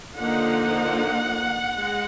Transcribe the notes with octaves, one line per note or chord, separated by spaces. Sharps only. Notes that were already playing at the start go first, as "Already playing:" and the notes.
D3 F3 A#3 D#4 F#5
G#3